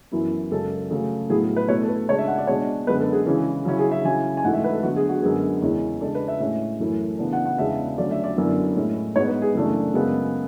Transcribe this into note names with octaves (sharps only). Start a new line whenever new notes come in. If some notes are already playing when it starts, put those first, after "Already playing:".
F#2 E3 B3 E4
F#2 C#3 G#3 C#4 A4
C#3 F#3 A3 C#4
A2 F#3 B3 E4 G#4
B4
B2 A3 E4 C#5
A4
B4
C#3 G#3 D4 C#5
E5
F#5
D5
B2 G#3 D4 C#5
F#2 D3 G#3 B3 B4
A4
G#4
C#3 E3 G#3 C#4 E4
C#3 F#3 C#4 E4
G#4
E5
C#3 F#3 C#4 E4 G#5
G#5
G#2 E3 A3 F#5
E5
B4
A4
D3 F#3 B3 F#4
G#4
F#4
F#2 D3 G#3 B3 G#4
E2 C#3 G#3 C#4 E4
C#3 G#3 D4 A4
B4
E5
A2 G#3 C#4 E5
F#2 E3 A3 C#4 E4
C#3 E3 B3 D4
F#5
F#5
E2 C#3 G#3 B3 D4 E5
D3 F#3 A3 C#4 D5
E5
D5
F#2 D3 F#3 B3 E4
A2 G#3 C#4 E4
G#2 G#3 B3 C#5
B4
G#4
F#2 C#3 E3 A3 D4
F#2 C#3 G#3 B3